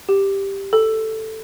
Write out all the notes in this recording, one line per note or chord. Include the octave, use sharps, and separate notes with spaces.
G4
A4